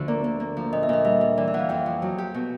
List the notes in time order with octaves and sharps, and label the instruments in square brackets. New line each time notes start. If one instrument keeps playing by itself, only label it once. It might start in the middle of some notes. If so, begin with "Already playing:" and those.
Already playing: [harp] D2 D3 F3
[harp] A#3 [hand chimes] D5
[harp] A#3
A#3
F3
[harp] A#2 [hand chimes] D#5
[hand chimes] E5
[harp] A#2 [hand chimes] D#5
[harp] G3 [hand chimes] E5
[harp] G3
[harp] E3 [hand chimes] D5
[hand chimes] E5
[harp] E3 [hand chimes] F#5
[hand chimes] F5
[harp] F2 [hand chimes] G5
[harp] F3
F#3
G4
B2